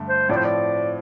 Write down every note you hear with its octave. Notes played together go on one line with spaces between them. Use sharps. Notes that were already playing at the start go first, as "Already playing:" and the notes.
Already playing: G2 D3 A3
C5
A2 F3 C4 D5
C5
D5